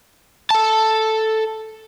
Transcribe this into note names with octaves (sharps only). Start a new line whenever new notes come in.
A4 A5